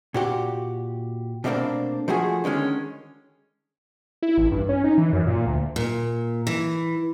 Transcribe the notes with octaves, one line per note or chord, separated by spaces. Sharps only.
A#2 F#4 G4
B2 G3 A3 A#3 C4 D4
F3 A3 F#4 G#4
D3 D#3 G#3 C#4
E4
A1
G2
C#4
D#4
E3
F#2
A#2
D2
A#2
E3